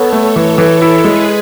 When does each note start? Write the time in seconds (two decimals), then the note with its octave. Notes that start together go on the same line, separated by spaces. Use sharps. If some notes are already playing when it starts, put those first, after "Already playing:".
Already playing: B3 A4 C#5
0.13 A3
0.36 E3
0.58 E3 A4 C#5
0.82 E4
1.04 G#3 G#4 B4